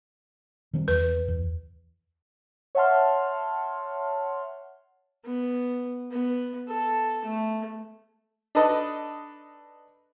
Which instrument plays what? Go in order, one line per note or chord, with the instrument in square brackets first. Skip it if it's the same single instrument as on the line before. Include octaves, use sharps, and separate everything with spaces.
[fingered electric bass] D#3 G3 C4
[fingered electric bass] E2 [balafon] B4
[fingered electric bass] E2
[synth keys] C#5 E5 F#5 A5 C6 F6
[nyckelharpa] B3
B3
A4
A3
[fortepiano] D4 D#4 A4 B4 D#5